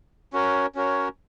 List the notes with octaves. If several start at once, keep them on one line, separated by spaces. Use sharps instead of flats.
C#4 F#4 A#4 C#5
C#4 F#4 A#4 C#5